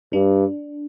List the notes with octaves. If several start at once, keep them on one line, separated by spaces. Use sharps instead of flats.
G2 D4